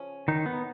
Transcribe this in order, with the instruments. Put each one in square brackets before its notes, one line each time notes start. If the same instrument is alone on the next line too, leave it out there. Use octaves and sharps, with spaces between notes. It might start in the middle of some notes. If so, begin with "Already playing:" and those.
Already playing: [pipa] C#3 F3 C#4
[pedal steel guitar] D#3 D#4
B3